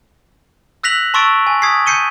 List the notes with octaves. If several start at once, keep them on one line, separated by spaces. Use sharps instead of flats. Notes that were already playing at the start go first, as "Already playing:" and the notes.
E6 F#6 A#6 B6 F7 F#7
A5 C6 C#6 E6 A6 D7
G#5
D#6 G#6 B6 C7
G6 C7 C#7 D#7 G7